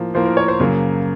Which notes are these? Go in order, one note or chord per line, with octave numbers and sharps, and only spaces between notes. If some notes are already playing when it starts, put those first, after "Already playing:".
Already playing: A2 F3 A#3
A2 F3 A#3 C5
A#4
C#5
C5
F#2 C#3 F#3 A#3